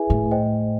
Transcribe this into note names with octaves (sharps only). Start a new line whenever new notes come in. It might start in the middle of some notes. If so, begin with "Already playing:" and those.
Already playing: E4 G#4 B4 E5 G#5
A2
C5 D#5 G5